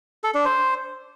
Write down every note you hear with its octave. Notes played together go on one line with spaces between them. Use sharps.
A4
D4
C5